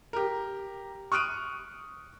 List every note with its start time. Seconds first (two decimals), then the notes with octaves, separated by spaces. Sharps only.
0.13 G4 A#4
1.12 C#6 D#6 F6 F#6 D7 D#7